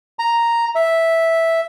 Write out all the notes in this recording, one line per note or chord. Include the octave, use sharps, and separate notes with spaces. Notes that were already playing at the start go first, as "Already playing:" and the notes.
A#5
E5